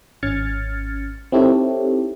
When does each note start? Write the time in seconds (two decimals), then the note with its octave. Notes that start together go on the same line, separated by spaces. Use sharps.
0.23 G#1 C#4 F6 G#6 A6 C#7
1.32 C4 D#4 E4 G4 A4 C#5